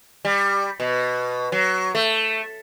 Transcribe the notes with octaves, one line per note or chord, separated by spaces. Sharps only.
G3
B2
F#3
A3